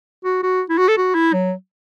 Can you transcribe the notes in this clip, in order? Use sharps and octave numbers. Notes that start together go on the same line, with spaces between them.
F#4
F#4
E4
F#4
A4
F#4
E4
F#3